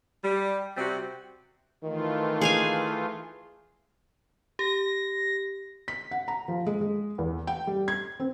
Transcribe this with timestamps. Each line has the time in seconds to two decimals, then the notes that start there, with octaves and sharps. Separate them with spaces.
0.23 G3
0.77 C3 G3 C4 F#4
1.84 D#3 E3 A3 F4
2.41 G#4 F5 G#5
4.59 G4 A#6
5.88 B6
6.11 F#5
6.28 A#5
6.48 F3
6.66 G#3
6.81 G#3
7.18 E2
7.47 G5
7.67 G3
7.88 G#6
8.20 C4